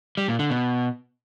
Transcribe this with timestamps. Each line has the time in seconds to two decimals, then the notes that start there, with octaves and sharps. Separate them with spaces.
0.17 G3
0.28 A#2
0.39 D3
0.50 B2